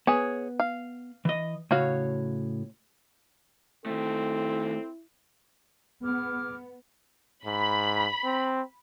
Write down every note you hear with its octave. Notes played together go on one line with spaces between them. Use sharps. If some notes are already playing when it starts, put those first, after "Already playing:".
B3 G#4 C#5
F5
E3 D#5
A2 C#3 F#4 C#5 F5
D#3 A3 C4 E4 A4
B3 G#4 D6 F6
G#2 B5
C4